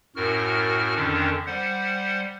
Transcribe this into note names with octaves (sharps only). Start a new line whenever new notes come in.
F#2 A2 F#4 A#4 F6
F2 D3 D#3 C#4 D4
G3 C5 F#5